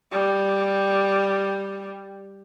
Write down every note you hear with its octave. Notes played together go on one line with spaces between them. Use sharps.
G3